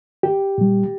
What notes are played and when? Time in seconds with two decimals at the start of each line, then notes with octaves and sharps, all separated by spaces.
0.23 G4
0.58 A#2 G3